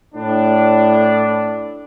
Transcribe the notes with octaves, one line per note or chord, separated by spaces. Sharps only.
A2 D4